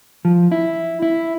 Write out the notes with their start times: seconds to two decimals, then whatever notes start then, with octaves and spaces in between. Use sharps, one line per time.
0.25 F3
0.52 E4
1.02 E4